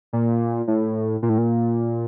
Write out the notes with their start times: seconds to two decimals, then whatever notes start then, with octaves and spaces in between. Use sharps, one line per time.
0.13 A#2
0.68 A2
1.23 A#2
1.29 A2
1.38 A#2